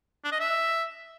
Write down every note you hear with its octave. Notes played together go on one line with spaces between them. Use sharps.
D4
D#5
E5